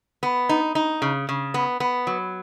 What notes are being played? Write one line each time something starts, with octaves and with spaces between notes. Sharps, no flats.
B3
D#4
D#4
C#3
C#3
B3
B3
F#3